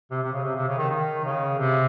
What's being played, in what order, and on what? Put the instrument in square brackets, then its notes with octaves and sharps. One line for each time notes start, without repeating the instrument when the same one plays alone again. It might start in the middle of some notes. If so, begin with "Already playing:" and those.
[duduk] C3
C3
C#3
C3
C3
C#3
D#3
D#3
C#3
C3